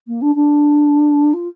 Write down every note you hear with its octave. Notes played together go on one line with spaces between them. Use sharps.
A#3
D4
D4
F4